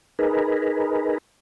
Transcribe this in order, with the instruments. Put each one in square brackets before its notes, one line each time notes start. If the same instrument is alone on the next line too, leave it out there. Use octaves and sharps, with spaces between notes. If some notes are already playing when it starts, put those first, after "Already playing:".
[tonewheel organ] D#4 G#4 A#4 B4